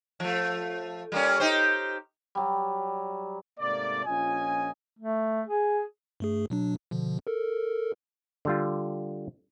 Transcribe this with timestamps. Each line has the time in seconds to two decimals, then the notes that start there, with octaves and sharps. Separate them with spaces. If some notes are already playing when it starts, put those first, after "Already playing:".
0.20 F3 A3
1.12 G3 A#3 C#4
1.40 D#4 G4 C5
2.35 F#3 G3
3.60 G#2 C3 A3 A#3 D5
4.05 A#1 C#4 F4 D#5 G#5
4.99 A3
5.47 G#4
6.20 G2 A3 G#4
6.50 B2 F#3 D4
6.91 B2 D3 F3
7.27 A4 A#4
8.45 D3 G3 F4